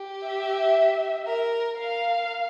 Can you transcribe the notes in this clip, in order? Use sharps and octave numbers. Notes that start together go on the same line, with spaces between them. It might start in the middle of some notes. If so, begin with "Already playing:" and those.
Already playing: G4
E5
A#4
A#4 F5